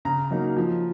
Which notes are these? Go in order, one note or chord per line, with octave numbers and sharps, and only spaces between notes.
C#3 A#5
F#3 A#3 D#4
F3